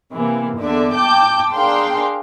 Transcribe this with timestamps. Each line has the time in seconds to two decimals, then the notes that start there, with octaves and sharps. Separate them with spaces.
0.13 C3 E3 A#3
0.58 E2 D3 D5 E5
0.95 G5 A5 D6 G6
1.52 D4 G#4 A#4 F5 G5 C6